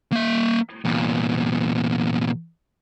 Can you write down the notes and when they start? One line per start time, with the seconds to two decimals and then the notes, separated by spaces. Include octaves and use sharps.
0.12 A#3 E5
0.85 E2 A#2